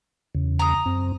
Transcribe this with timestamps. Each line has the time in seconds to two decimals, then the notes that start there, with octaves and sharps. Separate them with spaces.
0.35 E2 C#3
0.59 A#5 D#6
0.86 F#2 C4